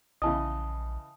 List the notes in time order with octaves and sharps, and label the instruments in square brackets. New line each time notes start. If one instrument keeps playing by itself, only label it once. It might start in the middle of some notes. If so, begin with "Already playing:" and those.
[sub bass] A#1 [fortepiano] C#3 E3 D#5 [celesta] A5 D#6